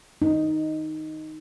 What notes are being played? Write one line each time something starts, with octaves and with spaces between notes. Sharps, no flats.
D#4